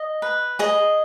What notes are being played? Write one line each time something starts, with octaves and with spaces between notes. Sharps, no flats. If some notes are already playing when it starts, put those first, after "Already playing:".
Already playing: D#5
B4
G#4 D#5